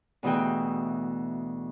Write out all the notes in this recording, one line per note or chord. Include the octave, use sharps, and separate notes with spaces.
D2 B2 E3 G#4 G5